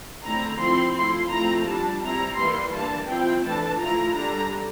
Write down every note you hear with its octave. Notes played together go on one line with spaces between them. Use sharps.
D3 A3 C4 E4 A#5
F3 C4 E4 C6
F3 A3 E4 C6
F3 A3 C4 E4 A#5
G3 D4 A5
G3 C4 E4 A#5
E3 G3 A#3 E4 C6
E3 A#3 D4 A5
F3 C4 E4 G5
E3 A3 D4 A5
F3 A3 E4 A#5
D3 G3 D4 A#5